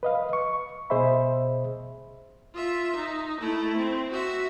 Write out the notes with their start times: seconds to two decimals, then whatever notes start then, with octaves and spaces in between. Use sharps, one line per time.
0.03 B4 D#5 F5
0.33 C#6
0.90 B2 G#4 C5 D#5 E5 B5
2.55 F4 E5
2.96 D#4
3.41 A3 E4
3.78 C4
4.12 F#4 E5